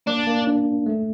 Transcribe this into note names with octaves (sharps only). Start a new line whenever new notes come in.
A#3 D4
A#3
D4
A3